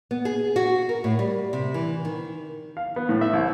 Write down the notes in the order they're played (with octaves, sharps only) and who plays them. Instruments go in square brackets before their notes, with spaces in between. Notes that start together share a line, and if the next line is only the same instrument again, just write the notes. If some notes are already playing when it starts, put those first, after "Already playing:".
[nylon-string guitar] B3
G#4
F#4
A#4
A2
G3
C3
E3
D#3
[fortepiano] F5
B3
A2
E5
C2